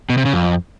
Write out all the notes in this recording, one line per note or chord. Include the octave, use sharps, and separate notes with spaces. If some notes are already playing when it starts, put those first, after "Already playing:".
B2
C3
C#3
F2